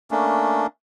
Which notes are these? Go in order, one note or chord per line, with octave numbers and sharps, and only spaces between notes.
A3 A#3 C#4 D4